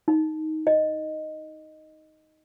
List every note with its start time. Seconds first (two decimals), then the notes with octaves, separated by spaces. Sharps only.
0.08 D#4
0.67 D#5